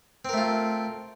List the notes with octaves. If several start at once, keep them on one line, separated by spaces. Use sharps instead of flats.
A3 C4 F4 A#4